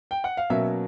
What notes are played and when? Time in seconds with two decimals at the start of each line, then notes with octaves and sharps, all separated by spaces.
0.11 G5
0.24 F#5
0.37 F5
0.50 B2 F#3 A#3 C#4 E5